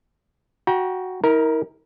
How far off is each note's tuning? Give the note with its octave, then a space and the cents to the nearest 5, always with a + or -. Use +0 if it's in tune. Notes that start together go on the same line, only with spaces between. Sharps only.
F#4 +0 G5 +0 A#5 +40
E4 -45 A#4 +0 A#5 +5